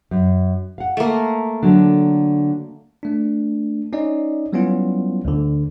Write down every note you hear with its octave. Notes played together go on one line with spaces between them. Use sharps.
F#2
F5 F#5
A3 A#3
D3 F#3 D4
A3 D4
C#4 D#4 D5 D#5
F#3 G3 B3 C#4 E4 F4
D2 D3